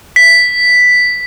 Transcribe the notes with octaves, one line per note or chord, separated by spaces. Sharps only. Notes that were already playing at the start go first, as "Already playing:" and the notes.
B6